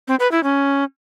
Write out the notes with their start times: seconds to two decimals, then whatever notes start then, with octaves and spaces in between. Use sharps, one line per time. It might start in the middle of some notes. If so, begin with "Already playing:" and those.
0.08 C4
0.20 B4
0.32 E4
0.43 C#4